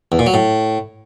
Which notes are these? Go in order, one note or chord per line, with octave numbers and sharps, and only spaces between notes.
E2
A#2
F#3
A2